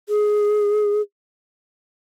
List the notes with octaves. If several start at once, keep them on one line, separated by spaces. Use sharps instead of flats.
G#4